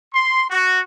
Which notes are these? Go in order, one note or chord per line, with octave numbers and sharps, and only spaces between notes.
C6
F#4